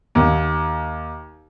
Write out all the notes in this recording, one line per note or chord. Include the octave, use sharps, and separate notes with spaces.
D#2